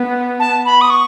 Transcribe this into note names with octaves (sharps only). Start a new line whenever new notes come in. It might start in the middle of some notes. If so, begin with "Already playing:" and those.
Already playing: B3
A5
B5
D#6
C#6